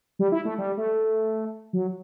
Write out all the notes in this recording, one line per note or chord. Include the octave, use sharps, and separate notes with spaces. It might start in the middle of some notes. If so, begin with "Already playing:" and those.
G3
E4
A3
G3
A3
F#3